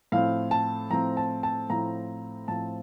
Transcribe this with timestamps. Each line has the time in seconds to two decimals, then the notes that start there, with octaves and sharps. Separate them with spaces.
0.12 A2 F3 C4 F5
0.51 A5
0.91 A2 F3 C4 A#5
1.17 A5
1.43 A5
1.70 A2 F3 C4 A#5
2.48 A2 F3 C4 A5